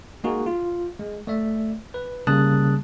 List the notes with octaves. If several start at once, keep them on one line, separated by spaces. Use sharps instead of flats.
G#3 A#3 D#4 F#4 G#4
F4
G#3
A3 D5 E5
B4
C#3 G3 A#3 A5 D#6 F#6